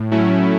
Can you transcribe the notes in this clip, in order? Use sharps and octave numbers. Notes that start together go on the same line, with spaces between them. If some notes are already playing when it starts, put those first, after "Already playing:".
Already playing: A2
F#3 A3 C#4 E4